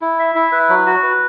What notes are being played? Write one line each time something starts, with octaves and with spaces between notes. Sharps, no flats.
E4
E5
E4
B4
F#3
F#4
B4